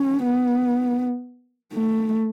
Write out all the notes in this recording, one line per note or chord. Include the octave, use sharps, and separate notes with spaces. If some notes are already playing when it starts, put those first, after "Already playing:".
Already playing: C#4
B3
A3